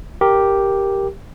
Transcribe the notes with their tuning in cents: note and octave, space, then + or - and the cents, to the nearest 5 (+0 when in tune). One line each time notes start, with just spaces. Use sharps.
G4 +0 A#4 +0